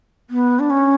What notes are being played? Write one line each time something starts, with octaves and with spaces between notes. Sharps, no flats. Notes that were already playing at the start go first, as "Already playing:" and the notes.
B3
D4
C#4